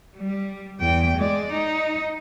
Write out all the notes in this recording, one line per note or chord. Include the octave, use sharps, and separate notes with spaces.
G3
E2 G5
G#3 D5
D#4